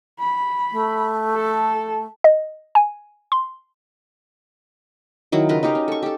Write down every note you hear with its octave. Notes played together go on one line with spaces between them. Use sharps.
B5
A3
A4
D#5
G#5
C6
D#3 F#3 E4
C#3 F4 A#4 B4
D#4 F#4 G4 F5
C#4
A4 C#6
G4 A4